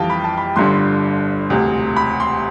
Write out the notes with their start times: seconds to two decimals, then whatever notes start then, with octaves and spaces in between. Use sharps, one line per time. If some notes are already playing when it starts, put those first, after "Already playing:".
Already playing: F2 E3 G3 F5 G5 A5
0.10 B5
0.24 A5
0.38 B5
0.56 G1 G2 D3 C6
1.49 E1 D2 C3
1.97 B5
2.20 C6